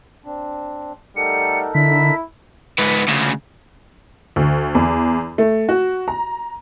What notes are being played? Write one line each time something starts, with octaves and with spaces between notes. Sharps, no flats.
C4 D4
G3 A3 D#4 A4 A#4 F#5 C#7
D3 E4 B6
G#2 B3
D2 C#3
D2
E2
A3
F#4
A#5